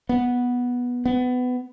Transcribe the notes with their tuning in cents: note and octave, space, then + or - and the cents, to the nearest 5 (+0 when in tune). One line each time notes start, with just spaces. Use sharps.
B3 -10
B3 +20